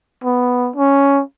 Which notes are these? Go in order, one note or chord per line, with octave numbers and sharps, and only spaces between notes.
B3
C#4